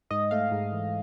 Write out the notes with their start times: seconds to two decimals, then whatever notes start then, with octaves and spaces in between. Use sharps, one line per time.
0.11 G#2 D#5
0.31 A3 F5
0.51 G#2
0.72 E3